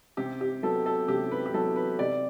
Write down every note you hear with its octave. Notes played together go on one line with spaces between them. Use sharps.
C3 G4
G4
F#3 B3 A4
A4
C3 G4
B4
G4
F#3 B3 A4
B4
C3 D5